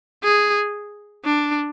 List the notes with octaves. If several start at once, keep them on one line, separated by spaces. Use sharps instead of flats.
G#4
D4